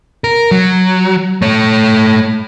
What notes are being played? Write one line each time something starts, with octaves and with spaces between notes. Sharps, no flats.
A#4
F#3
A3 C#5